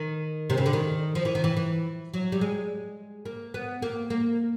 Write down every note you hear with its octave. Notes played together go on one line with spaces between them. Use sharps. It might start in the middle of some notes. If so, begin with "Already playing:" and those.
Already playing: D#3
C3
C#3
D3
D#3
F3
E3
D#3
E3
E3
F#3
G3
G#3
A#3
B3
A#3
A#3